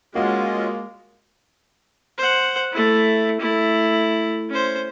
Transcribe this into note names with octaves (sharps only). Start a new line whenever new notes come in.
G#3 A#3 C#4 F4 F#4 D#5
C5 F#5
A3 E4
A3 E4
C#4 C5